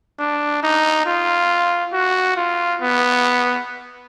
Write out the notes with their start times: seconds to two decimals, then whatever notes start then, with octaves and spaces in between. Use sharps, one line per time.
0.19 D4
0.63 D#4
1.06 F4
1.93 F#4
2.36 F4
2.81 B3